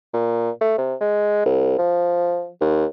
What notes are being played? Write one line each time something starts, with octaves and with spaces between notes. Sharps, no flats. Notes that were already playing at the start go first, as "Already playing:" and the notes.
A#2
A3
C3
G#3
C2
F3
D#2